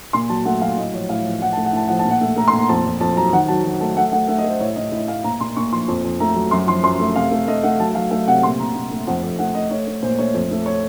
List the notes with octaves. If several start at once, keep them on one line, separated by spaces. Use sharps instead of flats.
A#2 C6
F#3 A5
A3 F#5
F#3 F5
A2 D#5
F3 C#5
A2 F5
F3
A2 F#5
A3 A5
F#5
A2 A5
F3 F#5
A5
A#2
F#5
A3
A3 A#5
C6
A#2
A#5
F2 A5
F2
F2 A5
F#3 A#5
D#3 F#5
F#3 A5
F#3
A3 A5
A3 F#5
A3 F#5
A3 F#5
D#5
A3
C5
A2 C#5
A2 D#5
A2 D#5
A3 F5
A#2 A#5
A#2 C6
A#2 C#6
F3 C6
F2
F2
A3 A#5
F#3
F#2 C6
F3 C6
F#2 C6
A3
C3 F5
A3
A3 D#5
A3 F#5
F#3 A5
F#3 F5
A3 F5
C3 F#5
A#2 C6
A#2 A#5
A#2
A3
F2 F#5
F2
A3 F#5
A3 D#5
A3 C#5
A3
A#2 C5
A3 C#5
F2
A3
C#5